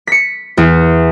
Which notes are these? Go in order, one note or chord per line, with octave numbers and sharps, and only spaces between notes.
B6 C#7
E2